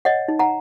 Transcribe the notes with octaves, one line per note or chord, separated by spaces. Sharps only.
C#5 D#5 F#5
D#4
F#5 A#5